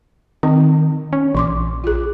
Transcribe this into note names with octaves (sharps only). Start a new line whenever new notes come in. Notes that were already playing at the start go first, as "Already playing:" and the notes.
D#3 C4
C#4
A#1 E3 C6 D6
F4 G#4